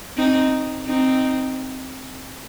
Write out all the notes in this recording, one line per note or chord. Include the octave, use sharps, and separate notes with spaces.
C4 D#4
C4 D#4